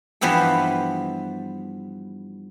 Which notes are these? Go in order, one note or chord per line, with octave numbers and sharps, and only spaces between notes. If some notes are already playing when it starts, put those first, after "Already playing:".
G2 E3 F3 B3 G4 A4